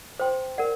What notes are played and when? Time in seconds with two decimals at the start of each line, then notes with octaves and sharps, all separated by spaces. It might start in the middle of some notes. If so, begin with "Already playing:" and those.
0.20 C5 G5 C6
0.58 A#4 D5 F#5